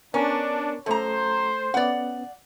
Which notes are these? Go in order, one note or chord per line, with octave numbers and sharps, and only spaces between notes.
B3 C#4 D4 A#4
F#2 A3 A4 C5 A#5
B3 C#4 D5 F#5